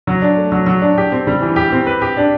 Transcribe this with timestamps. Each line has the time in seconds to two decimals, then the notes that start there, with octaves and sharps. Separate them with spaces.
0.07 F#3
0.22 D4
0.37 A3
0.52 F#3
0.67 F#3
0.82 D4
0.98 G4
1.12 C4
1.27 G3
1.41 E3
1.56 G4
1.72 C4
1.86 B4
2.02 G4
2.17 D4